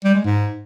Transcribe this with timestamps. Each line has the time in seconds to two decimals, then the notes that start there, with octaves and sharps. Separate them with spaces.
0.05 G3
0.15 G#3
0.25 G#2